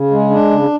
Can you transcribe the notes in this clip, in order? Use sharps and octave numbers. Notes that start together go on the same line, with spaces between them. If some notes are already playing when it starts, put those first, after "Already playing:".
Already playing: C#3
G#3
D4
C#3